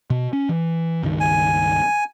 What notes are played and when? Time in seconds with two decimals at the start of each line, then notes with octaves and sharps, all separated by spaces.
0.10 B2
0.33 C#4
0.49 E3
1.03 C#2 G2 D#3
1.20 G#5